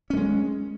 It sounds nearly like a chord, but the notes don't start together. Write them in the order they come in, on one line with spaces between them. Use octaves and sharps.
C#4 A3 G#3